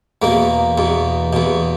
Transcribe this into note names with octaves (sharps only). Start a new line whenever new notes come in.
E2 B2 A#3
E2 B2
E2 B2